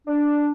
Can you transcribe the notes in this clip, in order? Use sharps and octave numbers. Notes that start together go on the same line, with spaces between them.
D4